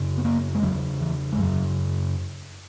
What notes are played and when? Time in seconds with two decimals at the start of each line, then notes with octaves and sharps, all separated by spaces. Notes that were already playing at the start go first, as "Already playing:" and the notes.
Already playing: F#2 C#3
0.18 B3
0.25 A#3
0.55 G#3
0.63 E2 C#3 F#3
1.01 E3
1.32 G#3
1.39 F#2 C#3 F#3